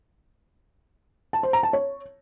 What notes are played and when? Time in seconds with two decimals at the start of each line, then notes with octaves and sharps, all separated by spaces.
1.33 A5
1.43 C5
1.53 A#5
1.63 A5
1.73 C#5